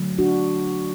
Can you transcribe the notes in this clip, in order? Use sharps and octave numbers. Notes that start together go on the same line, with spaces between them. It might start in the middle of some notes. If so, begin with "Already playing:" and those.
Already playing: D3 F#3 A3
D4 F#4